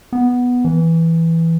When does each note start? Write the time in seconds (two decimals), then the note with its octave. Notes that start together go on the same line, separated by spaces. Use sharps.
0.13 B3
0.65 E3